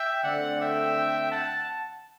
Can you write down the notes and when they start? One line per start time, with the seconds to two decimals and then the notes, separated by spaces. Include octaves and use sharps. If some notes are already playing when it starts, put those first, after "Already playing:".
Already playing: E5 G5
0.23 D3 A3 C4 D5 F#5
0.59 E5 G5
1.31 F#5 A5